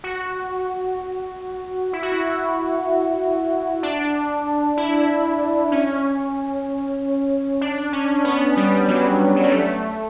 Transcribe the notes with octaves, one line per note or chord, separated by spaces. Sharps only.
F#4
E4
F#4
E4
D4
E4
C#4
D4
C#4
B3
G3
F#3
F#3
G3
A3